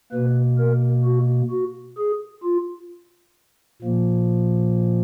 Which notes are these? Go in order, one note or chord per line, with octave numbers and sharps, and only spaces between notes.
B2 A#3 B4
A#4
F#4
F#4
G#4
F4
A#2 F3 A#3